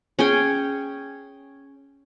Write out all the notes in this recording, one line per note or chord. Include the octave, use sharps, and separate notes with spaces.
C#4 G#4 G5